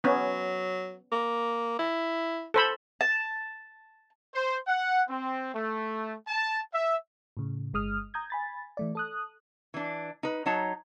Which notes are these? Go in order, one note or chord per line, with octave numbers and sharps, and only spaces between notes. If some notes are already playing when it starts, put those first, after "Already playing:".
F#3 B3 C#4
A#3
E4
A4 C5 B5
A5
C5
F#5
C4
A3
A5
E5
A2 C#3
G1 G#3 D#6 F6
A#5 D#6 G6 G#6
G#5 B5 A6
E3 A3 D5
A4 D#6 F#6
E3 D4
D#4 B4
F#3 D#4 C#5 A5 A#5